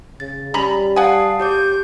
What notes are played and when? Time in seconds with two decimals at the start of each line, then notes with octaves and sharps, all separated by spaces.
0.20 C#3 A6
0.54 G3 C#4 A#5 B5
0.96 F5 F#5 G#5 A5 D#6
1.40 G4 C#5 D6 G6